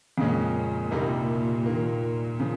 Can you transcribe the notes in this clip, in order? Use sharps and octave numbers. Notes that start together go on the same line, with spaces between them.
F2 A#2 C#3 G#3 C#4
C2 C3 G3 A#3 D#4
D#2 D#3 A#3
C#3 F3